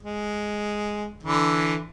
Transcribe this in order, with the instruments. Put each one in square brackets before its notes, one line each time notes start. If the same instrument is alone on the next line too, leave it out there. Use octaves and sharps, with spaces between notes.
[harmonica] G#3
D3 E3